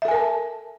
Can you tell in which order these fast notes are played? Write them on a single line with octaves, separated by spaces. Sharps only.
E5 A4 G#5 A#4 A5